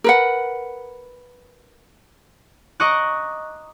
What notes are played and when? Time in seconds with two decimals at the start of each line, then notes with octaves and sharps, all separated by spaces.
0.04 A#4 B4 F#5
2.80 D#5 A#5 C#6 D6 F#6